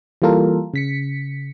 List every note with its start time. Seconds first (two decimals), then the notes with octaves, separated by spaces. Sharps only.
0.22 E3 G3 A#3 F4 A4 A#4
0.74 C#3 B6 C#7